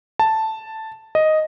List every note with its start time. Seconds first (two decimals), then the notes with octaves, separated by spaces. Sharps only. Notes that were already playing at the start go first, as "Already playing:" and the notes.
0.19 A5
1.15 D#5